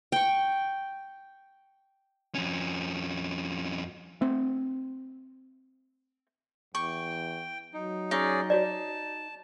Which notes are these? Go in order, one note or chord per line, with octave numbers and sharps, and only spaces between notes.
G5 C#6
F2 C#4
A3 C4
E2 G5 C#6
F#3 D#4
C#4 D#4 G#4 D5
F#4 C#5 D5 A5